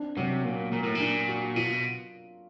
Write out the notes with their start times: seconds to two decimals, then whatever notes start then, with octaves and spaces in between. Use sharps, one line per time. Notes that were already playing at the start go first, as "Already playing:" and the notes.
Already playing: C4 D4
0.17 C3 F#3
0.44 A#2 A#3
0.72 A#2 A#4
0.83 A2
0.95 A#2
1.00 D4
1.28 F#4
1.56 B2 F4